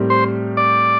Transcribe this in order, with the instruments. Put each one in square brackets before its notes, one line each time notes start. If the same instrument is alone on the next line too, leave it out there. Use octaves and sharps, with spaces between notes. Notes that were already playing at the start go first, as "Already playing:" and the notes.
Already playing: [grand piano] A2 G3 C4 G4 A#4
[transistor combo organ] C5
D5